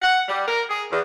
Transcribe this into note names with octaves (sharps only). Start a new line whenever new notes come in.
F#5
G3
A#4
G#4
E2